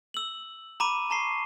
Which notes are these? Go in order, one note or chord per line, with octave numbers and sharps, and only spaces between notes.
E6 F#7
A#5 B5 D6 D#7
A5 A#5 C#6 C7